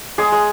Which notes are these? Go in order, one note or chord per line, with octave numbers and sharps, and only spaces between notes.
G#3 G#4
G#3